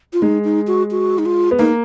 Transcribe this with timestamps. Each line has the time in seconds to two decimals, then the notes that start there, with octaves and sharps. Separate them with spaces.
0.13 F4
0.22 G#3 D#4
0.44 D#4
0.67 F#4
0.91 F#4
1.18 D#4
1.26 F4
1.51 B3
1.59 A#3 D#4